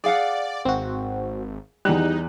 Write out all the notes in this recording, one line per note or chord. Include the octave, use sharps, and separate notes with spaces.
G#4 D5 F5 F#5
G#1 C4 F#4
E2 G3 D#4 F#6